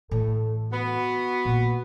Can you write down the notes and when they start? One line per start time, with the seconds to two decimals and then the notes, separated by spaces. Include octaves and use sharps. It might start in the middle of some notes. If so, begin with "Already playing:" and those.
0.11 A2 E3 A4
0.73 B3 F#4
1.45 A#2 A#3